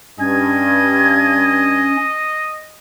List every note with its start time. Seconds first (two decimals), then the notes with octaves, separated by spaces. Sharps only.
0.19 G2 C#4 D#5 G#6